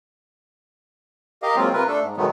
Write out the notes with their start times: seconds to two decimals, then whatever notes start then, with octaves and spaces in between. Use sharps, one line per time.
1.43 G4 A#4 D#5 F5
1.56 F#3 G#3 A#3 C4 F4
1.73 C3 F4 A#4 B4
1.87 A3 D4 A4
2.03 G#2
2.17 B2 D#3 F#3 G#3 A3 B3